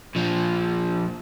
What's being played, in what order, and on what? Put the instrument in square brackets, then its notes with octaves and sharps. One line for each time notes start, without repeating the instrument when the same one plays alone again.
[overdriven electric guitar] A#2 F3